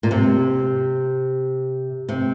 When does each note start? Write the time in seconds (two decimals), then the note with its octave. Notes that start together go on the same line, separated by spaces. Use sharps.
0.03 A#2
0.11 C3
2.09 C3